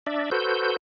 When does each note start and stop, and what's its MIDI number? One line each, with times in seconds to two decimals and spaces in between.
0.06 0.30 62
0.06 0.30 74
0.06 0.30 76
0.31 0.77 66
0.31 0.77 69
0.31 0.77 71
0.31 0.77 72
0.31 0.77 91